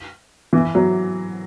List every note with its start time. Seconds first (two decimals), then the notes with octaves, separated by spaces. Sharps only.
0.53 E3
0.75 F#3